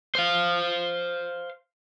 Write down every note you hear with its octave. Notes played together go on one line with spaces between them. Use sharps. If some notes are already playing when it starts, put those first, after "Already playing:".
C5 F5